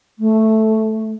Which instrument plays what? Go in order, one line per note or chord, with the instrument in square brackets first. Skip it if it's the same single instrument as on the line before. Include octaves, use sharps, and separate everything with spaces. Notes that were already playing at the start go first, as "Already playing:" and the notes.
[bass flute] A3